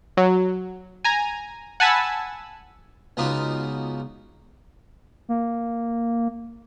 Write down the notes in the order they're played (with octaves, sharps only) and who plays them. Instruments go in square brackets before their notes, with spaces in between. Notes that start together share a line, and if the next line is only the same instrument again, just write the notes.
[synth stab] F#3
G#5 A#5
F#5 G#5 A5 B5 E6
[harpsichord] C#2 B3 D#4 F4 F#4 D5
[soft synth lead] A#3